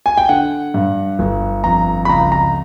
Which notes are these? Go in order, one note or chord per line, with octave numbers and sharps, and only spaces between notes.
G#5
G5
D3 F#5
G2
G1
F2 A#5
B5
C#2 A#5
A#5